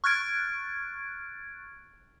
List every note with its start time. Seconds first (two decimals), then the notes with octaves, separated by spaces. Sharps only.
0.04 C#6 F6 F#6 G#6 A6 D7